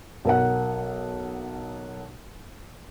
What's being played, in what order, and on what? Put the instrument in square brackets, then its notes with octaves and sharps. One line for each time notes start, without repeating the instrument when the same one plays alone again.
[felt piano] B1 A#4 F#5